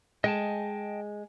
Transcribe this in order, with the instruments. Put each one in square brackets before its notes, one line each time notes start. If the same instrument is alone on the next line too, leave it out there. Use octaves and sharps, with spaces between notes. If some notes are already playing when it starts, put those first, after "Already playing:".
[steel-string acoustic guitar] G#3 [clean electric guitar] D#5 G5 A5